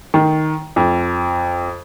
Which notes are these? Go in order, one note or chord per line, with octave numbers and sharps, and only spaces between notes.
D#3
F2